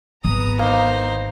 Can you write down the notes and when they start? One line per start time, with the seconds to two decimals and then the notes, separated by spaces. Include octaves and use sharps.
0.24 G#1 E2 B3 A#5 D#6
0.59 A#3 D#4 C5